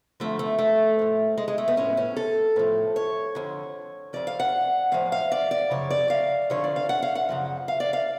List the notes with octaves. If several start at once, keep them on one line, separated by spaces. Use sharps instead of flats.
F2 D3 F3 A3
A3
A3
A2 F3
G#3
G#3
A3
B3
A2 F3 C#4
C#4
A4
A2 F3
C#5
F2 D3 F3
F2 F3 D5
F5
F#5
A2 F3 F5
F5
D5
D5
F#2 C#3 F3 C#5
D5
F5
F2 D3 F3 C#5
D5
F5
F#5
F5
F#5
F#2 C#3 F3
F5
D5
F5